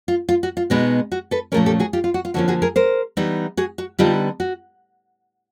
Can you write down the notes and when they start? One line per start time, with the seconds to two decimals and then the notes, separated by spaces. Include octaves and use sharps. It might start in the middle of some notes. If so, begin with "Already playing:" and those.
0.08 F4
0.29 F4
0.43 F#4
0.57 F4
0.70 B2 G#3 B3 D#4 F#4
1.12 F#4
1.31 A4 B4
1.52 A#2 F3 A3 C#4 G#4 A#4
1.66 G4 A4
1.80 F#4 G#4
1.93 F4 G4
2.04 F4
2.14 F#4
2.25 F4
2.34 D3 F3 A#3 C#4 F#4
2.48 F#4 G#4
2.62 G#4 A#4
2.76 A#4 C5
3.17 E3 G3 B3 D#4
3.57 F#4 G#4
3.78 F#4
3.99 D3 G3 B3 D#4 F4 G4
4.40 F#4